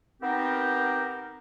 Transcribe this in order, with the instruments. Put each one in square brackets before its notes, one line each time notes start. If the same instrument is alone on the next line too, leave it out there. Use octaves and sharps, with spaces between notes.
[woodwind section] B3 C4 D#4 G4 A#4